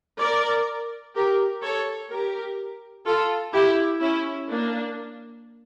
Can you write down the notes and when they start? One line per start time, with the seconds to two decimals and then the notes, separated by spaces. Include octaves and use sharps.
0.19 A#4 D5
1.15 G4 A#4
1.62 A4 C#5
2.10 G4 A#4
3.06 F4 A4
3.53 E4 G4
4.01 C#4 E4
4.49 A#3 D4